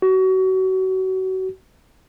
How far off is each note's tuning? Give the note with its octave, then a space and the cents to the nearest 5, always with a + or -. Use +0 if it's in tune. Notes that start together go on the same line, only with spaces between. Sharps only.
F#4 +30